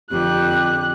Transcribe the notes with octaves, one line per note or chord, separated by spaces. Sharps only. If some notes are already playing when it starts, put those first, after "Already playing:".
F2 D3 G4 F#6